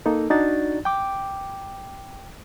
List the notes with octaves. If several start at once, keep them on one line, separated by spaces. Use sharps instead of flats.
A#3 D#4 A4
D4 D#4 F#4 D5 A6
G5 D6